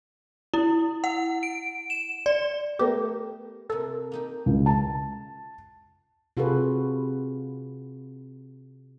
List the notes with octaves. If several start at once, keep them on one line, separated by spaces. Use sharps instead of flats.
E4
F#5
D7
E7
D5
A3 B3 G4 A#4
C3 A#3 A4
A#3 D#4 G4
C#2
A5
C3 F4 F#4 G#4 A4 B4